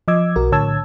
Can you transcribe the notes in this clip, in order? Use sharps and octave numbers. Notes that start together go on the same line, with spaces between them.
F3 D#5 D6 E6 G#6
B1 F#4 A#4
A2 D3 C#5 A5 E6 G#6